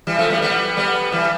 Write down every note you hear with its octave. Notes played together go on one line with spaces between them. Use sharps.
E3 G3
F3 A3
G3 B3
G3 B3
G3 B3
E3 G3